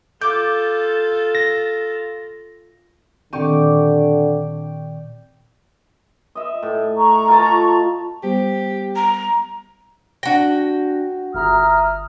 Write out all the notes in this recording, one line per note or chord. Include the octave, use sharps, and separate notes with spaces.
F4 A4 D6 G6
A#6
A#2 D3 D#3 C4 G4 D5 C#6
D#5 E5
A2
A#5 C#6
F4 A4 A5
G3 B3 G4 C5
A#5
D4 F#4 G5 A#6
G1 E5 A#5 D#6 F6